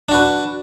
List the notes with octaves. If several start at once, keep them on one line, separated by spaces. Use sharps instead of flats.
D4 F#4 B4